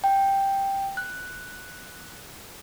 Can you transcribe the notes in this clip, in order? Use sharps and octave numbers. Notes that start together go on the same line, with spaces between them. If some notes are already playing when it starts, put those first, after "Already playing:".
G5
F#6